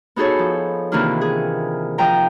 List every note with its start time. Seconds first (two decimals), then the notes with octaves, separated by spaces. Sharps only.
0.16 B3 D#4 F#4 G#4 A4 C#5
0.39 F3
0.92 C3 D#3 E3 A#3 D4 F4
1.21 G#4
1.98 F3 D#5 G5 A#5